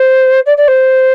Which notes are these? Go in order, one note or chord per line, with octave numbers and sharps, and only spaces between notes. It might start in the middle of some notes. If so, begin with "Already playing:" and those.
Already playing: C5
D5
D5
C5